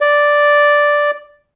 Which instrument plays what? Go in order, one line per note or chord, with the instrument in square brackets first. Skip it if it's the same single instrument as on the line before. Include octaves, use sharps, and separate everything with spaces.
[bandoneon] D5